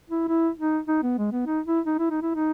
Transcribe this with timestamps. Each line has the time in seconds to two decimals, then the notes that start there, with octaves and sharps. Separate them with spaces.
0.10 E4
0.28 E4
0.58 D#4
0.88 D#4
1.03 B3
1.18 G#3
1.32 B3
1.46 D#4
1.66 E4
1.86 D#4
1.99 E4
2.10 D#4
2.22 E4
2.34 D#4